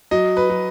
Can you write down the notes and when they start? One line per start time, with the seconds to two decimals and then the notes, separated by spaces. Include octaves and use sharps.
0.11 F#3 D#5
0.37 B4
0.50 F#3